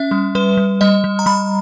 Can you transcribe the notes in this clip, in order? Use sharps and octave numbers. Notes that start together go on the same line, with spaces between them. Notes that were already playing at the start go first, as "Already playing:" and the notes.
Already playing: C#4 E5
G3
G3 B4
G3
G3 D#5
G3
A#5
G3 B5